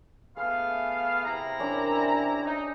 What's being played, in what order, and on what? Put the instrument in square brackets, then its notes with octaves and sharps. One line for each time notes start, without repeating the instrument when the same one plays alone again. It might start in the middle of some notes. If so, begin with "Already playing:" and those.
[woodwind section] A3 B3 F5 [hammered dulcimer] G#4
[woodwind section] C3 E4 A#5
[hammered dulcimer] C#4 D4 A#4
[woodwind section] D#4